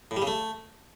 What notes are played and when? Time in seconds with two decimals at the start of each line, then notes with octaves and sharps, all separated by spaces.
0.11 A2
0.16 G3
0.22 C#3
0.27 A3